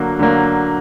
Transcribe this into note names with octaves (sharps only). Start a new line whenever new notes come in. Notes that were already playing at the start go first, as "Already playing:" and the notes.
Already playing: D3 F#3 A#3
D3 F#3 A#3